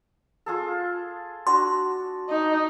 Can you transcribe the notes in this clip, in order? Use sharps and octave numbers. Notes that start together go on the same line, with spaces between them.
F4 G#4 A4
D4 F#4 D5 C6
D#4